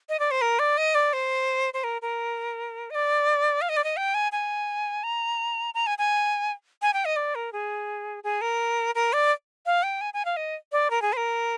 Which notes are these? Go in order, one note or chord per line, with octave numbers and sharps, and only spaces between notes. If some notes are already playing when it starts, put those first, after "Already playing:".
D#5
D5
C5
A#4
D5
D#5
D5
C5
C5
A#4
A#4
D#5
D5
F5
D#5
D5
D#5
G5
G#5
G#5
A#5
A#5
G#5
G#5
G#5
G5
D#5
D5
A#4
G#4
G#4
A#4
A#4
D5
F5
G5
G#5
G#5
F5
D#5
D5
A#4
G#4
C5
A#4